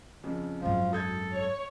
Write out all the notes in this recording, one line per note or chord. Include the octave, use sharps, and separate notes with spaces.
F2 C#3
G#1 F#2 F3
A4 D#6 G6 G#6
C#5